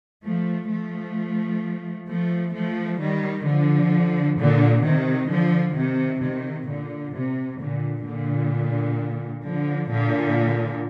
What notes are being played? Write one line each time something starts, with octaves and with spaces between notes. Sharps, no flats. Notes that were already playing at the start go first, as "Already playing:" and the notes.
F3 A3
F3 A3
F3 A3
F3 A3
D#3 G3
D3 F3
A#2 D3
C3 D#3
D3 F3
C3 D#3
C3 D#3
A#2 D3
C3
A#2 D3
A#2 D3
D3 F3
A#2 D3